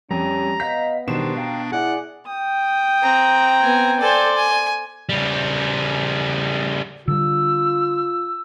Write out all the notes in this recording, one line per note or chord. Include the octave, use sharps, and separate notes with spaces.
F2 G3 C#4 A#5
B3 D#5 F5 G6 B6
B2 D#3 G3 D4 C5 E7
F5 G5 A#5
E4 G#4 D5 F#5
G5 D#6
C4 A#5
B3 G#5
A4 C5 D5 G#5
G#5
C#3 G3
D3 G3 F4 E6